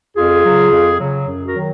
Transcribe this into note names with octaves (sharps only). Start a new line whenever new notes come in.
F2 F4 G#4
C#3 F#3
F2
C#3 F#3
F#2
F#4 A#4
D#3 F#3